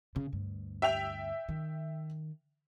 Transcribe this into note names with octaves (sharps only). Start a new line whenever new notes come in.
C#3
D2 G2
E5 G5 F7
D#3